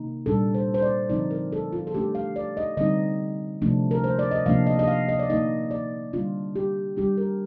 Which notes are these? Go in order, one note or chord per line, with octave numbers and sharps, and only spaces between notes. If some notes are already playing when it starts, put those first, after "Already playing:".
Already playing: C3 D#3 A#3 D#4
A#2 G3 D4 A4
C5
C5
D5
D3 F3 C4 D#4 D5
A#4
A4
F4
A4
D#3 A3 D4 G4
F5
D5
D#5
D3 G3 C4 D#4 D#5
C3 F3 A3 D4
A#4
C5
D5
D#5
C3 F3 A#3 D4 F5
D#5
D#5
F5
D#5
D5
D#3 A#3 D#4 D#5
D5
D3 G3 D4 F4
G4
D#3 G3 D4 G4
A#4